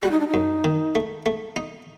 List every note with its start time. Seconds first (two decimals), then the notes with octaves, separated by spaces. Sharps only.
0.02 G3 F#4
0.11 D#4
0.20 D4
0.28 D#4
0.34 F#2
0.64 D#3
0.95 A3
1.26 A3
1.56 D#4